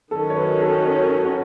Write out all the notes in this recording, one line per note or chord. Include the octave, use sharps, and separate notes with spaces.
D#3 F#3 C#4 A4
C#5
B4
A4
C#5
A4
F#4